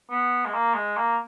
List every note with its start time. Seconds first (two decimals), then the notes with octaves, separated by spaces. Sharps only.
0.10 B3
0.45 G#3
0.53 A#3
0.75 G#3
0.97 A#3